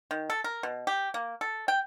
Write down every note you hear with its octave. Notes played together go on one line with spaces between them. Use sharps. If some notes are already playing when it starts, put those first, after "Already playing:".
D#3
A4
A#4
B2
G4
A#3
A4
G5